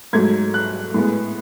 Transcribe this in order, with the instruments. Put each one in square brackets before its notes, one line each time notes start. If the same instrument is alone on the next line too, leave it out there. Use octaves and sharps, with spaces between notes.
[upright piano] G#2 F#3 A3 G#6
F#6
A2 G#3 B3